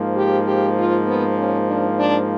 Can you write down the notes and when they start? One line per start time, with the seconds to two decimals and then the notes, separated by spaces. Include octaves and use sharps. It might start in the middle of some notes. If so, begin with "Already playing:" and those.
Already playing: G#2 F3 A#3
0.16 G4
0.46 G4
0.76 F4
1.06 B3
1.37 C#4
1.66 D4
1.98 D4